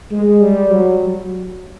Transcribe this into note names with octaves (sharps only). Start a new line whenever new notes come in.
G#3
G3
F#3